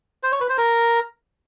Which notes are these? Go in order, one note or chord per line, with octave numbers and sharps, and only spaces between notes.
C5
C#5
B4
C5
A#4